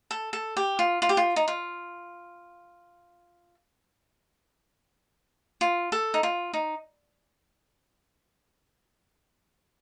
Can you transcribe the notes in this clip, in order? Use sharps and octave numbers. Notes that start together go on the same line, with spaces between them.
A4
A4
G4
F4
F4
G4
F4
D#4
F4
F4
A4
D#4
F4
D#4